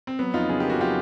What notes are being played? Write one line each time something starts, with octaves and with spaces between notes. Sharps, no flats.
C4
F#3 B3
F2 D#4 F4
C#3 G#4
A#3 G4
F#4
F#3 F4 G4